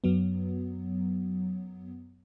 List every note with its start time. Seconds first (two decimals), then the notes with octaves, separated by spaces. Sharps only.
0.04 F#2 F#3 B3